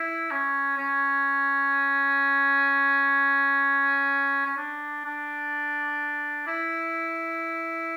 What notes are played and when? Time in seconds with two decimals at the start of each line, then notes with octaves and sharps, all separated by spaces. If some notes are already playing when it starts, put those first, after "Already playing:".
Already playing: E4
0.31 C#4
0.78 C#4
4.46 C#4
4.57 D4
5.05 D4
6.47 E4